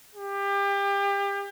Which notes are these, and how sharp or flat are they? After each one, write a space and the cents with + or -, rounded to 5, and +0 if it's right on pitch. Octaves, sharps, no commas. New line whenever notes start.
G4 +30